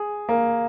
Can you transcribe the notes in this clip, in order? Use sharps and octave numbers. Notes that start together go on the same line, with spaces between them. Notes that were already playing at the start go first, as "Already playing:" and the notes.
Already playing: G#4
A#3